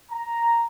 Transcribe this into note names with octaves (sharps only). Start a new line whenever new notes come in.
A#5